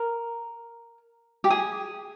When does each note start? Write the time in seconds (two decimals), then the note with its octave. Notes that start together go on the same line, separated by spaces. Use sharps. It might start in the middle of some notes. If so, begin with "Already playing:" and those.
Already playing: A#4
1.44 G4
1.50 G#4